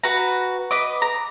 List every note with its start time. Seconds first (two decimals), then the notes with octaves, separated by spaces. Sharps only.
0.04 F#4 B4 A#5
0.71 B4 D#5 D6
1.02 A#5